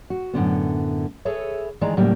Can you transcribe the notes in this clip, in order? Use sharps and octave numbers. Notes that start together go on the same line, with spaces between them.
F#4
F#2 A2 D3 B3
G#4 A4 B4 C#5 E5
D#3 E3 G#3 D5 D#5 A#5
A2 C#3 F#3 G3 A#3